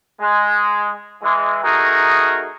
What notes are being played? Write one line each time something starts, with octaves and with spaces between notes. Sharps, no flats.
G#3
E3 G#3
A3 D#4 F#4 G#4 A#4